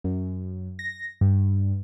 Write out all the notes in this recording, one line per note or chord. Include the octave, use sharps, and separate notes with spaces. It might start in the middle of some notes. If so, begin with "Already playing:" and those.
F#2
A#6
G2